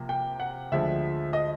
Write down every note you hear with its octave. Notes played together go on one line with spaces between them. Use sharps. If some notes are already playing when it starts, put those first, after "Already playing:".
Already playing: C3 F3 A#3
G5
F#5
D2 D3 F3 G#3 E5
D#5